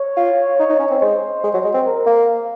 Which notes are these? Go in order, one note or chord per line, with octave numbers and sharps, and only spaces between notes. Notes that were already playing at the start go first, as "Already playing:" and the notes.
Already playing: C#5
F4
D#4
D#4
C#4
C4
G#3 C5
G#3
F#3
G#3
C4
A#4
A#3